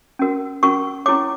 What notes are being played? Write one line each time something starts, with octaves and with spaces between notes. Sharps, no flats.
C#4 F#4 A#4
C#4 F#4 A#4 C#6
C#4 E4 G4 C#5 D6